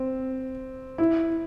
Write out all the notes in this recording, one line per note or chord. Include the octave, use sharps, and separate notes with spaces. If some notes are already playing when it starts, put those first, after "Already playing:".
Already playing: C4
E4